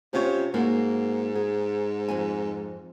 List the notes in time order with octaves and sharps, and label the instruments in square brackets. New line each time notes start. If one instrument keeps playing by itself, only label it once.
[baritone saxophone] C3 [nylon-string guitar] C#4 F4 C#5
[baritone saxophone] G#2 [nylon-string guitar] A#3 F#4
[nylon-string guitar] G#4
F2 C4 G#5